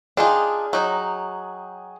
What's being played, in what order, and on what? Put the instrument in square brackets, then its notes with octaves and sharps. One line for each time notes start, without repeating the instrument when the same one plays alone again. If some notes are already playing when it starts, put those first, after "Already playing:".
[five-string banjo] D4 D#4 F4 [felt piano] G#4 G5 G#5
[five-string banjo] F#3 D#4